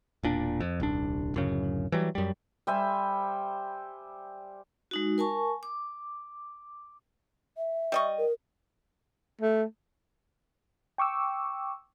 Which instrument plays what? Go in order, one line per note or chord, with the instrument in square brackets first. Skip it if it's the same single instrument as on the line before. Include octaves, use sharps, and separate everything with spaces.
[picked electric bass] E1 A#2 D4
F2
D#1 C2 D4
D1 F#2 C#3
E3 F#3 G3
F#2 G3
[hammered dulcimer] G3 C5 E5 G#5
[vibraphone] G#3 D#4 F#4
A#4 G#5 A5 C#6
D6
[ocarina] E5
[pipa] G3 D#5 C#6
[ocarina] A#4
[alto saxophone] A3
[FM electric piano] G5 C#6 D6 E6